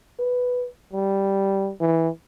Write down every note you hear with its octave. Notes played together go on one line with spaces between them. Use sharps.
B4
G3
E3